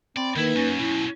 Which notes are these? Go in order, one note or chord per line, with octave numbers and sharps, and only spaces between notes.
C4 D5 B5
D2 D#3 A#3 D#4 E4 B4
F#2 C#4
F#2 B2 E4